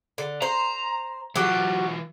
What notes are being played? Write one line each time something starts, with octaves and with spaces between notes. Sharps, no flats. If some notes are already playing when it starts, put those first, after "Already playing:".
D3
C5 A#5
E3 F#3 F4 G4